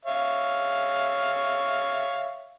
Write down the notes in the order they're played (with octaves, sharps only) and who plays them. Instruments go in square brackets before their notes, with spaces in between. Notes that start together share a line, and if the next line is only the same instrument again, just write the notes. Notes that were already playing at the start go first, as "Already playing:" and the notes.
[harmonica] C#5 E5 F5